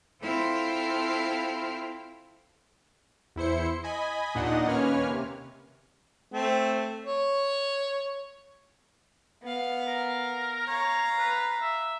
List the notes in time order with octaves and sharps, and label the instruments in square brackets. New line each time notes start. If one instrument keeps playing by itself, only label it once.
[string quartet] C4 E4 F4 A4 F5 G5
[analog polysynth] E2 E4 C5 C#7
D#5 G#5 B5
D#2 A#2 D4 D#4 D#5 F#5
D#2 A#3 C#4 B4 C#5 F6
C3
[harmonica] A3 C4
C#5
[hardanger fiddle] B3 F5
[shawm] A#4
[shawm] C#5 [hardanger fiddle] F5 A#5
[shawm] B4
E5